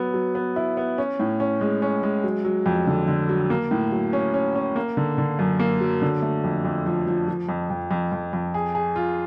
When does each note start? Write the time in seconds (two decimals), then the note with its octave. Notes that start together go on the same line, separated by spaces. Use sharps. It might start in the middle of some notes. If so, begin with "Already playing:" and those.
Already playing: F#3 B3
0.14 F#3
0.35 B3
0.56 E4
0.77 B3
0.98 C#4
1.20 A2
1.40 C#4
1.61 G#3
1.82 C#4
2.03 G#3
2.24 F#3
2.45 F#3
2.66 F2
2.87 D3
3.08 D3
3.29 F#3
3.50 A#3
3.71 A2
3.92 F#3
4.13 C#4
4.34 C#4
4.55 C#4
4.76 A#3
4.97 D3
5.18 D3
5.39 F#2
5.59 A#3
5.81 F#3
6.02 D3
6.22 A3
6.44 F2
6.65 F2
6.86 F3
7.07 F3
7.28 F3
7.49 F2
7.70 F2
7.91 F2
8.12 F2
8.33 F2
8.54 G#4
8.75 G#4
8.96 F4